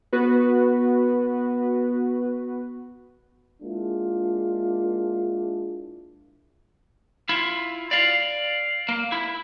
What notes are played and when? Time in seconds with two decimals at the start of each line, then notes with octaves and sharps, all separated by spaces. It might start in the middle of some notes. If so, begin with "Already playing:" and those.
0.13 B3 F#4 B4
3.63 G#3 A#3 D4 E4 F4
7.29 E4 F4
7.91 D5 F5
8.89 A#3
9.12 E4